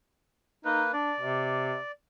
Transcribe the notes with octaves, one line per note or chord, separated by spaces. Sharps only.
A#3 D#4 B4
D4 D5
C3